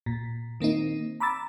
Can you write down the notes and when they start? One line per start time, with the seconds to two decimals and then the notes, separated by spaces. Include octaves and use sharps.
0.06 A#2
0.60 D#3 A#3 C4 D#4
1.20 A#5 B5 D6 E6 A6